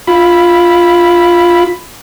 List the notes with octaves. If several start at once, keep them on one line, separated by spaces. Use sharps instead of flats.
F4 B5